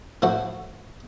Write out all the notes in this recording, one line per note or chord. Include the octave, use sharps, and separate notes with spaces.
A2 F3 E4 F#4 F#5